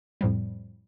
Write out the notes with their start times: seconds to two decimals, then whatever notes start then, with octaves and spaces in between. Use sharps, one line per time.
0.21 F2 A2 F3 G3